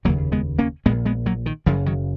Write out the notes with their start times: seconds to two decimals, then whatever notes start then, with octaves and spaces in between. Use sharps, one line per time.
0.05 F1 D#2 C#3 F#3 A#3
0.32 G#3 B3
0.59 A#3 C#4
0.86 A#1 A#2 G#3 B3
1.06 G#3 B3
1.26 F#3 A#3
1.46 D#3
1.66 F#1 F#2 C#3 F3
1.86 D#3 F#3